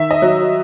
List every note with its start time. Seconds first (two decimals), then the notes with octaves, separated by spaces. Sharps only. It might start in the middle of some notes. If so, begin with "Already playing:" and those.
Already playing: D#3 E5
0.11 D#5
0.22 F#3